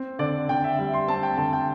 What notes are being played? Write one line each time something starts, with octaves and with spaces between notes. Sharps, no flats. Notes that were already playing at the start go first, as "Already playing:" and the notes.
Already playing: C4
D3 D5
D3 G5
E5
G3 E5
C6
C4 A5
G5
D3 A5
G5